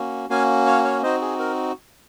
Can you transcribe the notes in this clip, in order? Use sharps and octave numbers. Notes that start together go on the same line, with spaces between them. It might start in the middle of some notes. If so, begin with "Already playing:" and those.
Already playing: A#3 C#4 F#4
A#3 C#4 F#4 F5 G#5
C#5 F5
C#5 F5
C4 D#4 F#4 C5 D#5
G#4
A#4